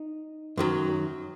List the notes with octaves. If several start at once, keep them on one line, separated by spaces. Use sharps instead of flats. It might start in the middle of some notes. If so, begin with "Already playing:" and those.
Already playing: D#4
F#2 D#3 F#3